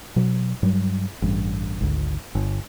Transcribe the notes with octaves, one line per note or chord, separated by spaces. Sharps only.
B2 F#3
G2 F#3 G3
A1 G2
G#1 D2
G1